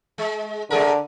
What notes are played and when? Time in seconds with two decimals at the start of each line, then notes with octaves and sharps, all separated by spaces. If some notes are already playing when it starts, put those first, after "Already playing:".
0.18 G#3
0.70 D3 G#3 G#4 A#4